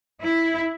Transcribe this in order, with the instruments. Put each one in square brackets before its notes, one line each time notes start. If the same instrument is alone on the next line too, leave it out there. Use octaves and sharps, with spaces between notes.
[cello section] E4